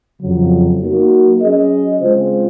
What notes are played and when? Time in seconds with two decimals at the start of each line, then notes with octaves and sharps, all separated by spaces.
0.20 F2 C#3 F#3
0.80 F#3 A#3 D#4 F#4 A#4
1.40 F#3 C#4 G#4 D#5
2.00 C#3 G#3 C4 F4 C5